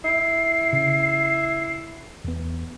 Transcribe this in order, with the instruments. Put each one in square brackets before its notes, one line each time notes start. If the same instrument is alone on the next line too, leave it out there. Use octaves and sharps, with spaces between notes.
[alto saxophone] E4 [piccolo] C7
[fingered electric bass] C#3
E2 B3